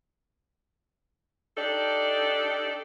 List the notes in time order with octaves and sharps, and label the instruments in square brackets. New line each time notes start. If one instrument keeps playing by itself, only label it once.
[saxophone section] D4 D#4 G4 A4 D5